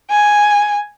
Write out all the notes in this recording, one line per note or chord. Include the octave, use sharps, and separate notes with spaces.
G#5